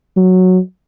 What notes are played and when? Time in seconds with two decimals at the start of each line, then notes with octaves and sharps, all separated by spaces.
0.17 F#3